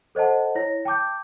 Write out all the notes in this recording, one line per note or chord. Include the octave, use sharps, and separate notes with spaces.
A4 C5 D#5 F#5 A5
E4 C#5 A#6
G5 A5 D6 G6